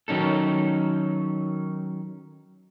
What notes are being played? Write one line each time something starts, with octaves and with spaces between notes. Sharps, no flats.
D#3 F#3 C#4 D#4 A4